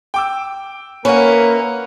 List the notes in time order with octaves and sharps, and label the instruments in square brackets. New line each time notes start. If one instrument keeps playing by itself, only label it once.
[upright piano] G5 D6 E6
[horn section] A#3 A#4 [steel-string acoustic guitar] C#4 E4 [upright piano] B4 F#5